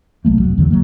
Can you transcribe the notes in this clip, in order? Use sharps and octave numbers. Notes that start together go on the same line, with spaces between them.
C2 F#3 A3 A#3
F1 F#3
E2 D3 D#3 F#3
F#3 A#3